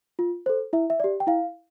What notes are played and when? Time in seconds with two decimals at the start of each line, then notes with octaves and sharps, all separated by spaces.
0.19 F4
0.46 A4 C5
0.73 E4 E5
0.90 E5
1.00 G4 D5
1.20 G5
1.27 E4 F5